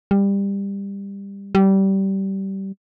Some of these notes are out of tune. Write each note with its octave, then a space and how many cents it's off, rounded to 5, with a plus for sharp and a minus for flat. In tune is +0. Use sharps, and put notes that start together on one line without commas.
G3 +20
G3 -20